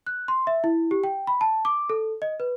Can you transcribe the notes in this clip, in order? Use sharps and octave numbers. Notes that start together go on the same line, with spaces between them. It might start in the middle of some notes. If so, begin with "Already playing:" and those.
F#6
C6
E5
E4
G4
G5
B5
A5
D6
A4
D#5
B4